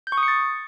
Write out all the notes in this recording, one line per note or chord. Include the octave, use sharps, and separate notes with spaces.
G6
C#6
D#6
C#7
A6